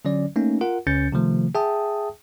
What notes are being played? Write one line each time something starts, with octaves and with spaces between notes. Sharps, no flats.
D3 F#3 C#4 D5
A3 A#3 C#4 D#4
F4 A#4 F#5
C#2 C#3 C#4 G6 A6 C#7
C3 D#3 F3 A3
G#4 E5 G5 A5 D#6